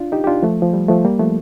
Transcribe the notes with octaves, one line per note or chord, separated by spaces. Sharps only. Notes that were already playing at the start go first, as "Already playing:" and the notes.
Already playing: D4 F4
D#4 G4
G4
D4 F4
F3 A3
F3
G3
F3 A3
G3 A#3
F3 A3